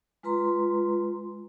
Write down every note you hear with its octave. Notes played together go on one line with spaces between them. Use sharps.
G#3 F4 B4 A#5 C6